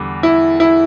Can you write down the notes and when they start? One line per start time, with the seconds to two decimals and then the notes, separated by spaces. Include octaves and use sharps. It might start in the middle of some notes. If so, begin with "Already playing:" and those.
Already playing: E2 D3 G3
0.23 E4
0.60 E4